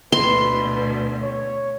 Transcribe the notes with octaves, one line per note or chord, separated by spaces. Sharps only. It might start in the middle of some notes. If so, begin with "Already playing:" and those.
D2 B2 B4 C6
C#5